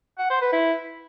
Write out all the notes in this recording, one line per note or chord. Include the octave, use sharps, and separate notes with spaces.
F#5
C5
B4
E4